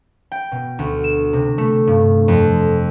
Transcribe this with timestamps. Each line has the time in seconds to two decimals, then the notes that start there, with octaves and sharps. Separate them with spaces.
0.32 G5
0.52 B2
0.79 D2
1.04 E7
1.33 C3
1.58 A3
1.87 G2
2.28 F2